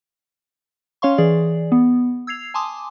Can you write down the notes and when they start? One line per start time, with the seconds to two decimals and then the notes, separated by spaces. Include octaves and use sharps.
1.02 C#4 C#5 F5 C6 C#6
1.18 E3 G#4 D5
1.72 B3
2.27 E6 G#6 C7 F7
2.54 G#5 A5 C6 D6 D#6